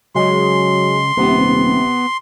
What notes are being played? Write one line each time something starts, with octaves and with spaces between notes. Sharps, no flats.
C#3 F#3 G#3 C6
D#1 C3 B3